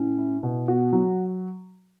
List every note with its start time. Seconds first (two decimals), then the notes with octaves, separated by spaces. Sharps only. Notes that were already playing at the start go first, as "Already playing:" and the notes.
Already playing: A2 C#4
0.18 E4
0.43 B2
0.68 B3 F#4
0.93 F#3